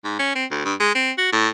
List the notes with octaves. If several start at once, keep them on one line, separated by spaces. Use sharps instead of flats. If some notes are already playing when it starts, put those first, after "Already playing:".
G#2
C#4
C4
D2
G2
G#3
C4
F#4
A2